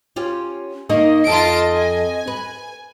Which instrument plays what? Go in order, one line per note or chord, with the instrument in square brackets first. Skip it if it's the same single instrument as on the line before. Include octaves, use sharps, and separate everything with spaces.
[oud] C#4 F4 G4
[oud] D#3 A#3 D#4 [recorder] D#5
[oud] F2 [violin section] F4 A5 D7
[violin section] G#5
[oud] B4